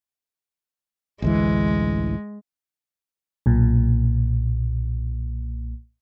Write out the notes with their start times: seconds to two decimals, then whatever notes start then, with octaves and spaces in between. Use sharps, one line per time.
1.22 A1 D2 E3 G#3
3.46 B1 A#2